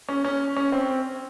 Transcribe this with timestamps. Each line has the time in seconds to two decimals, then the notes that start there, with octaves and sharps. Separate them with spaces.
0.09 C#4
0.24 C#4
0.56 C#4
0.72 C4